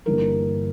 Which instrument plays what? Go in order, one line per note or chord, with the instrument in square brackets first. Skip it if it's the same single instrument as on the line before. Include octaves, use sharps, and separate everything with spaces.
[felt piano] G1 G2 E3 A#3 A#4